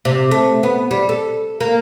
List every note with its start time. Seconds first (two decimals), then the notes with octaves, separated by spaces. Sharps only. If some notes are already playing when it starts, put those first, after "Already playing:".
0.05 C3
0.31 A3
0.63 B3
0.91 G3
1.09 A4
1.60 A#3